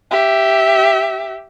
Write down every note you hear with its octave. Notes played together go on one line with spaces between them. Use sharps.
G4 E5